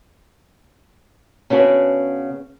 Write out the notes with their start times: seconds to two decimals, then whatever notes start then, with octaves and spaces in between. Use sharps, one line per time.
1.50 C#3 B3 D4 F#4